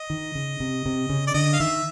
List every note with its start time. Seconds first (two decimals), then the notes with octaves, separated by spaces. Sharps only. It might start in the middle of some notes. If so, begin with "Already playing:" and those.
Already playing: D#5
0.10 D#3
0.35 C#3
0.60 C3
0.86 C3
1.10 C#3
1.27 D5
1.34 D3 D#5
1.53 F5
1.59 D#3 E5